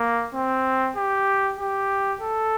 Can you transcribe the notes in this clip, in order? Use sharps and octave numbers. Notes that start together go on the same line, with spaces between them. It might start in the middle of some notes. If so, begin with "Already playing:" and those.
Already playing: A#3
C4
G4
G4
A4